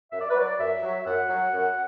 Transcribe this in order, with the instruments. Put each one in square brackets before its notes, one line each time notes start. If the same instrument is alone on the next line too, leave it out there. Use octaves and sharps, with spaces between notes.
[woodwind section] F#2 E5
D5
B4
F#3 D5
F#2 E5
F#3
F#2 F#5
F#3
F#2